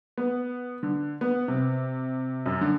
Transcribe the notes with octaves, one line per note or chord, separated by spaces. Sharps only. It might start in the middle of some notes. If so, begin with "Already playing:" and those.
B3
D3
B3
C3
F#2
D3